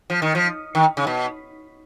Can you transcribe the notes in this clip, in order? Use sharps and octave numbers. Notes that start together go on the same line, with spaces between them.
F3
D#3
F3
D#3
C#3
B2